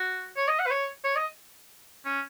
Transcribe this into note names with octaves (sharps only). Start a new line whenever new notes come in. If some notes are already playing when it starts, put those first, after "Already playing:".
Already playing: F#4
C#5
D#5
F#5
B4
C#5
C#5
D#5
C#4